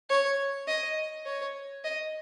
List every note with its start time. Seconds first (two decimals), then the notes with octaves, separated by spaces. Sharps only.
0.09 C#5
0.67 D#5
1.26 C#5
1.84 D#5